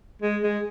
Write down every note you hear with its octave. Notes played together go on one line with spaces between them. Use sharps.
G#3
G#3